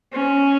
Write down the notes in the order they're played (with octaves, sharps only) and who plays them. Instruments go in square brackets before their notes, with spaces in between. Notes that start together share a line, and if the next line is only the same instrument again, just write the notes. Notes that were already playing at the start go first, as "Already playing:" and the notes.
[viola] C#4